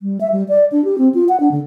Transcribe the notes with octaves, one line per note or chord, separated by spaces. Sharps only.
G3
E5
G3
D5
D4
G4
C4
F4
F#5
D4
D3